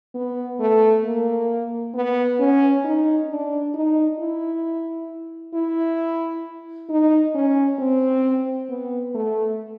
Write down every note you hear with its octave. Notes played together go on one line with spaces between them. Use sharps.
B3
A3
A#3
B3
C#4
D#4
D4
D#4
E4
E4
D#4
C#4
C4
B3
A3